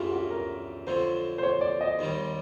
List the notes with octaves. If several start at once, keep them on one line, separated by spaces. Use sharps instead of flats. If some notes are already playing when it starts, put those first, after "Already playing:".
Already playing: F#2 C#3 E3 A3 D4 F4 G4
F#4
A#4
F2 D3 F#3 C5
C5
C#5
D5
D#5
D#2 D#3 G3